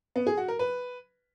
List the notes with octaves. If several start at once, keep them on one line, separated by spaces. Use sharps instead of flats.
B3
G#4
F#4
A#4
B4